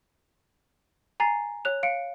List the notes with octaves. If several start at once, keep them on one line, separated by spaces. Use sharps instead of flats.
G#5 A#5 A6 C7
C#5 F#6 F7
F5 C#7 D7